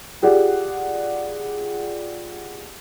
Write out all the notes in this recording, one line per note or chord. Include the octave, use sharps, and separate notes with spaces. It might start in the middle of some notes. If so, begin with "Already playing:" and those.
F4 G4 G#4 D5 F#5